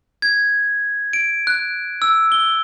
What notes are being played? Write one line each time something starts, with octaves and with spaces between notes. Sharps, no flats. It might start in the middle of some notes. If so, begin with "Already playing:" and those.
G#6
D7
F#6
E6
G7